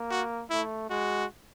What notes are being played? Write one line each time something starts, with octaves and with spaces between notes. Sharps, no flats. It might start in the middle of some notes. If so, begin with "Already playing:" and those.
Already playing: A#3
F#4
A3 E4
G#3 F#4